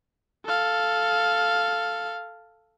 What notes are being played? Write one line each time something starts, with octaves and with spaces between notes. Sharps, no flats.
A4 F5